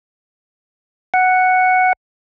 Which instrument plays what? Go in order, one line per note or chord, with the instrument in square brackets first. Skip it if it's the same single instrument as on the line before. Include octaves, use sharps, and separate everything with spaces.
[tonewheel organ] F#5